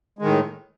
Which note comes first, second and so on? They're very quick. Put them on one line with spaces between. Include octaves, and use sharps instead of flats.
G#3 D#3 A2